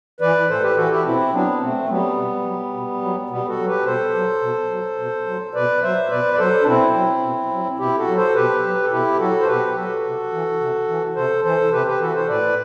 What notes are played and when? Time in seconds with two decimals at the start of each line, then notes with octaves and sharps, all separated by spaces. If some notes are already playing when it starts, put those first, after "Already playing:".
0.21 E3 B4 D5
0.49 A2 A4 C5
0.63 G4 B4
0.77 E3 F#4 A4
0.91 E4 G4
1.05 B2 C4 E4
1.33 F#3 B3 D4
1.61 B2 A3 C4
1.78 A3
1.89 F#3 G3 B3
2.17 B2
2.45 F#3
2.74 B2
3.02 F#3
3.29 B2 G3 B3
3.48 F#4 A4
3.58 F#3
3.67 G4 B4
3.85 B2 A4 C5
4.15 F#3
4.42 B2
4.70 F#3
4.98 B2
5.27 F#3
5.54 B2 B4 D5
5.83 F#3 C5 E5
6.10 B2 B4 D5
6.34 D5
6.39 F#3 A4 C5
6.62 D4
6.66 B2 C4 E4
6.94 F#3
7.23 B2
7.51 F#3
7.79 B2 E4 G4
7.98 F#4 A4
8.08 F#3
8.17 A4 C5
8.35 B2 G4 B4
8.63 F#3
8.83 A4
8.91 B2 E4 G4
9.19 F#3 F#4 A4
9.41 C5
9.47 B2 G4 B4
9.68 G4
9.76 F#3 F#4 A4
10.05 C3
10.32 E3
10.61 C3
10.88 E3
11.16 C3 A4 C5
11.44 E3 A4 C5
11.72 C3 G4 B4
11.86 G4 B4
12.00 E3 F#4 A4
12.14 A4 C5
12.29 A2 B4 D5